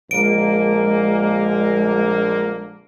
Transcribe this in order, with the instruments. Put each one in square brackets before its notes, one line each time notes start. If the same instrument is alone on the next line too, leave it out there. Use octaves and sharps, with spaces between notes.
[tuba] A#1 [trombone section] D3 A#3 [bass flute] G#3 [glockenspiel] D7